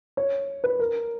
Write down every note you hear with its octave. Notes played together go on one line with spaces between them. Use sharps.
C#5
B4
A#4